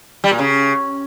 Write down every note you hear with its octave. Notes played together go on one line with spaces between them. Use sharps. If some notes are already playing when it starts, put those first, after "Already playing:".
G3
A#2
C#3